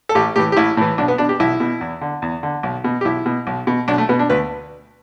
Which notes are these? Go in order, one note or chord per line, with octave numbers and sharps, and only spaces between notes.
A4
A1 G4
A2 E3 G4
G4
A1 E4
A2 E3
B1 D4
B3
B2 D4
G4
B1 E4
B2
E2
D3
E2
D3
B1
B2
G4
B1 E4
B2
B1
B2
B1 D4
A3
B2 B3
D4
D2 B4